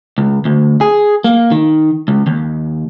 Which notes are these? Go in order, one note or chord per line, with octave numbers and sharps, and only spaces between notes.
C#2
D2
G#4
A#3
D#3
C#2
D#2